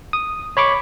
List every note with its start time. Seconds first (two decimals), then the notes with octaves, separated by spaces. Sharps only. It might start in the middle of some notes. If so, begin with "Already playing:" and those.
0.13 D#6
0.57 C#5 B5 C#6 D6